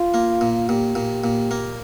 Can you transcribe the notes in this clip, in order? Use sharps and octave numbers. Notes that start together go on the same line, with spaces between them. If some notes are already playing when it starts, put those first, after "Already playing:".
Already playing: F4
A#3
A#2
A#2 G4
A#2
A#2
A#3